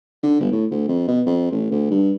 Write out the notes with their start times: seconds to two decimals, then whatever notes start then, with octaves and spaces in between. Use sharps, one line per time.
0.23 D3
0.40 G1
0.52 A2
0.71 D2
0.88 F2
1.07 B2
1.26 F2
1.51 A1
1.71 D2
1.91 G2